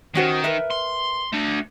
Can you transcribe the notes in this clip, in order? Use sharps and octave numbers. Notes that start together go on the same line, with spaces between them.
D#3 C#4 F#4 C5
A#4 B4 E5
C6
A3 D4